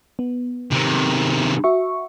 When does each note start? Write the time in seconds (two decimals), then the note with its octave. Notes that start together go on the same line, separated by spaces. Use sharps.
0.19 B3
0.72 C3 D#3
1.64 F#4 E5 C#6